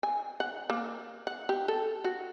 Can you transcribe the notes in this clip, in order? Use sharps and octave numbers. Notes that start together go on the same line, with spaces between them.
G#5
F#5
A#3
F#5
G4
A4
F#4